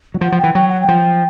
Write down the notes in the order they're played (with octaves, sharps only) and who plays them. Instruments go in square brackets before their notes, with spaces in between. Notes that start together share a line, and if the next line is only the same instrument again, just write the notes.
[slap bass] F#3
[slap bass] F3 [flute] F#5
[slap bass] F3
[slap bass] E3 [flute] G5
[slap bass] F#3 [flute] G5
[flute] F#5
G5
[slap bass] F3